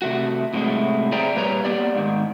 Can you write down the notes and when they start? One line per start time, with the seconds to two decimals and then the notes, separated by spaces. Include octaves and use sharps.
0.02 C3 A3 F#4
0.53 A2 C3 F#3 G#3 A3
1.12 G#4 C5 D5 E5 G5 A#5
1.36 A#2 G3 B4 C#5 A#5
1.65 A#3 B3 G4 D5
1.95 G#2 D#3